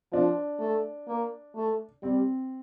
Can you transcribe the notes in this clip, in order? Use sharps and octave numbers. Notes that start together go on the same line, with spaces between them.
F3 D4
A3
A#3
A3
G3 C4